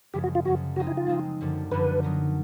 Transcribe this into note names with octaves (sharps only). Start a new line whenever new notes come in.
F#2 C#3 F3 G#3 G4
F#4
F4
F#2 C#3 F3 G#3 F#4
F3 G#3 C4 D#4 F#4
E4
F4
F3 G#3 C4 D#4
F#2 D3 F3
F#2 D3 F3 B4
F#3 B3 D#4